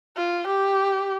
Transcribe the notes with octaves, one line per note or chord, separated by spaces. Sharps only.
F4
G4